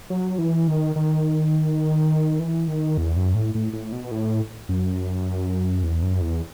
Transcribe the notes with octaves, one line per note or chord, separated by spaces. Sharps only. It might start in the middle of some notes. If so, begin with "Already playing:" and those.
F#3
E3
D#3
D#3
E3
D#3
E2
F#2
A2
A2
A2
B2
A2
F#2
E2
F#2
E2